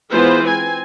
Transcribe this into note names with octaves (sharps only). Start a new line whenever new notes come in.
E3 G#3 B3 F4 B4 C5
C4 G#5